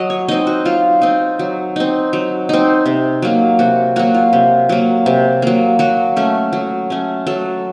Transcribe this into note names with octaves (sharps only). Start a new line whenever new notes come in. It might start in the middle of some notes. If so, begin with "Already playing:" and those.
Already playing: F#3 D#5
C#5
C4 D#4 D#5
F#4
F#3 F4
C4 D#4
F#3
C4 D#4
F#3
C4 D#4
C3
F#3 A#3
C3 F#4
F#3 A#3 F#4
F4
C3
F#3 A#3
C3
F#3 A#3
F#3 F#4
A3 C#4
F#3
A3 C#4
F#3 A4